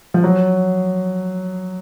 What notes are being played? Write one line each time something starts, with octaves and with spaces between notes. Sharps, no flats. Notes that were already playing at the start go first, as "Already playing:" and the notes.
F3
F#3